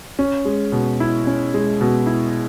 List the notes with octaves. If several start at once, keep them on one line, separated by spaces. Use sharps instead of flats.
C#4
G#3
B2
E4
C#4
G#3
B2
E4